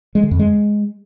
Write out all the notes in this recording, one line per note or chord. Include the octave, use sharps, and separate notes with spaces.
G#3
D3
F2
G#3